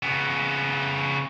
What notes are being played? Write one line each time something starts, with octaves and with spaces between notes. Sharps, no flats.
C#3 B3